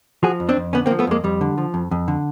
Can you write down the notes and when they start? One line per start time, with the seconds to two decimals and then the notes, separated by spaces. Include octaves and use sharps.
0.23 F3 F#4 G#4
0.40 F2
0.49 C4 D4
0.57 F2
0.73 D3 B3 C#4
0.86 A#3 C4
0.91 F3
0.99 A3 B3
1.07 F2 G#3 A#3
1.24 F2 G3
1.41 D3
1.58 F3
1.74 F2
1.91 F2
2.08 D3